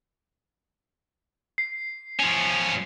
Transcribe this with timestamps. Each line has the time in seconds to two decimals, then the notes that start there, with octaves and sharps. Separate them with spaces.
1.58 C7
2.20 F3 C#4